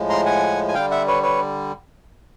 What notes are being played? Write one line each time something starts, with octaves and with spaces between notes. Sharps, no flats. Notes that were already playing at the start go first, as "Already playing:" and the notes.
Already playing: A2 F3 G#3
A#5 C6
F#5 G#5
G#5
D3 G3 F5 G5
E5 F#5
B4 C#5
B4 C#5